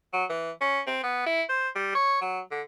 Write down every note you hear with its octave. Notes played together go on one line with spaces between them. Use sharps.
F#3
E3
C#4
C4
B3
E4
C5
G3
C#5
F#3
D3